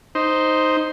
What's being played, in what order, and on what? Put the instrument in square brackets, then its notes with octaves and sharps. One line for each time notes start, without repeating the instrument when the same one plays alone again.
[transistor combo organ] D#4 C5